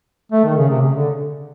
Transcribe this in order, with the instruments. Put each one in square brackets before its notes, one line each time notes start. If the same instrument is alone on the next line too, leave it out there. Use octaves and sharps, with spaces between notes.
[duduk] A3
D#3
C#3
C3
C#3
D3